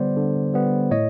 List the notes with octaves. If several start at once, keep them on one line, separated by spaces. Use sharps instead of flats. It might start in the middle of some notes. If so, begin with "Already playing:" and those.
Already playing: D3 G3 B3 C5 D5
D3
G3 B3
A2 C#5 D#5